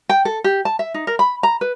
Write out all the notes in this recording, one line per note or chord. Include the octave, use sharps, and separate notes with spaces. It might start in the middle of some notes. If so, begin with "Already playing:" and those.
G5
A4
G4
A5
E5
D#4
A#4
B5
A#5
B4